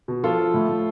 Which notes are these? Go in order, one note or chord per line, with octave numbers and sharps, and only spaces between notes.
B2
F3 F4 A4
F3
A2
A2